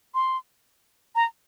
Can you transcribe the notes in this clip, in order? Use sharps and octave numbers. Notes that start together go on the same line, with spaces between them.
C6
A#5